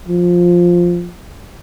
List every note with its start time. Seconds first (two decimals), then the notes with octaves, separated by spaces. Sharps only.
0.08 F3